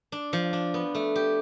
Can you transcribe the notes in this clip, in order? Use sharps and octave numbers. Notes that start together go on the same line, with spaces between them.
D4
F3
D4
B3
A3
G4